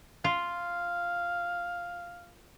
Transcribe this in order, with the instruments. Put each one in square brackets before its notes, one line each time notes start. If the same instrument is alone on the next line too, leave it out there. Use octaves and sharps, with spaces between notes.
[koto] F4 [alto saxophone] F5